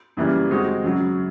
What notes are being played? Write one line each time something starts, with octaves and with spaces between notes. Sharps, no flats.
F#2 C#3 E3 G3 A#3
D#3 G#3 C4 D#4 F#4
F#2 C#3 F#3